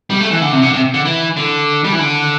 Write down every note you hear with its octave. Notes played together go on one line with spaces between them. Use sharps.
G3
A3
E3
D3
C3
D3
C3
D3
E3
D3
G3
E3
D3